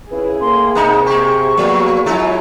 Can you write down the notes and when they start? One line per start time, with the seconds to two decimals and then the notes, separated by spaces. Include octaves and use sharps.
0.11 C#3 C#4 E4 G#4 B4
0.41 A2 A#3 C6
0.75 C3 A#3 D#4 A#5
1.06 A#3 G4 C#6
1.57 F3 F#3 A#3 B3
2.06 F#3 G#3 C#4 E4 F4 A#5